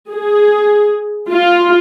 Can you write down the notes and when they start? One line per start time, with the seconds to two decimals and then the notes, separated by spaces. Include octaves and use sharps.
0.11 G#4
1.30 F4